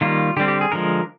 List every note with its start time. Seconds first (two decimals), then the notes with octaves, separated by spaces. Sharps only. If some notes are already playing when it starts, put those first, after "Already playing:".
0.01 D#3 G3 A#3 F4
0.37 D3 G4
0.40 G3 C4
0.48 G4
0.61 G#4
0.72 D3 F3 G#3 A#4